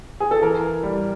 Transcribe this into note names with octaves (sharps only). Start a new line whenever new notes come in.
G#4
A4
E3 A#4
G3